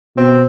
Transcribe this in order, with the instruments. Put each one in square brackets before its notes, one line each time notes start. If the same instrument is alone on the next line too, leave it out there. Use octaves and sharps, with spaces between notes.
[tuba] B2 [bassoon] C4